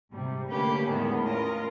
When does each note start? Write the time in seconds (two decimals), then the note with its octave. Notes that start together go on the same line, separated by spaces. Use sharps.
0.11 G#2 C3 G3
0.50 D3 A3 A#3 C#4 G4 B4
0.88 E2 A2 D#3 G#3 B3 C#4
1.27 C#4 F4 A#4 D#5